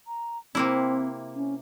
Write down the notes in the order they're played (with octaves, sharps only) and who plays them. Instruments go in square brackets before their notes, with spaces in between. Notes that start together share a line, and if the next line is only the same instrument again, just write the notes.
[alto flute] A#5
[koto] C3 A#3 E4 [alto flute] C4
[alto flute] C#4